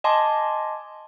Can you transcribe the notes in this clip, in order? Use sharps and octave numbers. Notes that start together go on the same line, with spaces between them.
D#5 G#5 A5 C6 D6